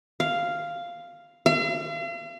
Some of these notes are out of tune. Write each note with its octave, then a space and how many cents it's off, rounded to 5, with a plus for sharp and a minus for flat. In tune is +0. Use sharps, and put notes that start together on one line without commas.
F5 -5
F5 -45